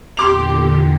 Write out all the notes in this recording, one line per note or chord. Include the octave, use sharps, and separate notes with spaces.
E2 A#2 D3 G4 C6 D6 F7